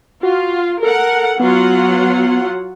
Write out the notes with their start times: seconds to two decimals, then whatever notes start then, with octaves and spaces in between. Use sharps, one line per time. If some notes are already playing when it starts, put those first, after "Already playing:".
0.23 F4 F#4
0.83 A4 A#4 F#5
1.40 F#3 B3 F4 F#5